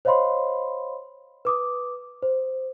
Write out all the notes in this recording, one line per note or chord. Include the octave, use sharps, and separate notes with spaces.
C5 C#5 D#5 F5 B5 C6
B4 D6 D#6
C5